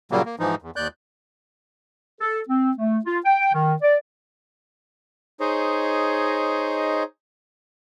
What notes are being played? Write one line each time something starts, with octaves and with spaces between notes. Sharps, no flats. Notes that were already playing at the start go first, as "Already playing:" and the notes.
A#2 C#3 F#3 G3 A#3
A#3
G#2 E3 F3 D#4
E2
D#2 D5 F#6 G6
A4
C4
A3
F4
G5
D#3
D5
D#4 G#4 C5 C#5 D#5